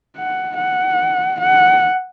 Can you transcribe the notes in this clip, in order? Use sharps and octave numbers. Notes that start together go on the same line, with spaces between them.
F#5
F#5
F#5